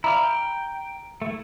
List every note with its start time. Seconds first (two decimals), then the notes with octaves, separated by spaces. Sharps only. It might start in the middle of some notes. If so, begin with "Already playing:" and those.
0.04 E4 D5 F5 A#5
0.23 G5
1.22 A3 E4